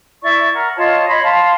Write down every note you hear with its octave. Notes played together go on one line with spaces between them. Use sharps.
E4 D5 C#6
A#4 F#5
F4 C#5 D#5 A5
C#5 D#5 B5 C6
F5 A5 C6